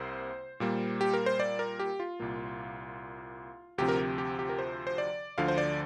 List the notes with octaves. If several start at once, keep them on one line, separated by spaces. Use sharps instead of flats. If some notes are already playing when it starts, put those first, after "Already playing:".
Already playing: C2 C3 A#3 C5
A#2 G3 A#3
G4
A#4
C5
D5
A#4
G4
F4
C2 A#2 A#3
D2 C3 F3 C4 G4
A#4
G4
G4
G4
A#4
C5
C5
D5
D2 D3 F3 F5
C5
D5